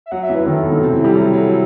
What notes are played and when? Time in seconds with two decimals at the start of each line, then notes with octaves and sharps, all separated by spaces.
0.06 E5
0.12 F#3 F#5
0.23 E5
0.29 E3
0.35 B4
0.40 E3
0.46 D#3 A4
0.63 B2
0.72 D#3
0.81 C3
0.92 E3
1.00 F#3
1.04 G3 G4
1.15 F#3 A4
1.33 F#3
1.39 A4
1.50 A4